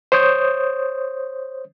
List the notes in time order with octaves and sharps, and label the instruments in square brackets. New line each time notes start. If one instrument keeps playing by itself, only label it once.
[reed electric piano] C5 C#5 D#6 G6